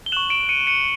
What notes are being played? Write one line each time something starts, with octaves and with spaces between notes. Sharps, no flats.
G7
C#6 F#6 E7 F#7
D7 E7
C#7 D#7
C#7 D#7